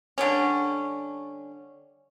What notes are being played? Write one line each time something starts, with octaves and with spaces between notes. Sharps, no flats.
D3 G3 C#4